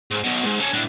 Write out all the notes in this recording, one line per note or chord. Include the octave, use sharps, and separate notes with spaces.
G#2
B1 B2
G#2
C#4 A4
A2 D4